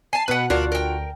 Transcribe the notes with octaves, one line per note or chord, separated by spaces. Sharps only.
G#5 A5 C7
B2 B4 F#5 F#6
D2 D4 F4 F#4 A#4
A#4 G5